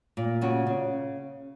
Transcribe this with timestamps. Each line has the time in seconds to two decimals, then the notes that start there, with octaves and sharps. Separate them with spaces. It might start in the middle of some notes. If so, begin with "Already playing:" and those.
0.17 A#2
0.41 C#3 F#4
0.67 C#3